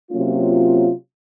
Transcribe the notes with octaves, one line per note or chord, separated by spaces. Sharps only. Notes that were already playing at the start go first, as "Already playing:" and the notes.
C3 F#3 A#3 C#4 F4